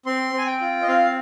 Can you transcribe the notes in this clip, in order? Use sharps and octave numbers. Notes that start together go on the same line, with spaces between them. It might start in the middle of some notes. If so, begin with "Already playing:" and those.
C4 C6
C4 G#5
G5
F4
D#5
C4 F5